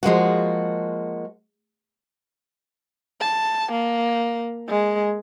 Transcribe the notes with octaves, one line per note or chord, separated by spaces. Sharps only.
F3 G#3 A#3 F#4
A5
A#3
G#3